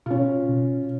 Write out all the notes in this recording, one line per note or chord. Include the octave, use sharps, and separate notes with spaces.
B2 C#4 F4
B2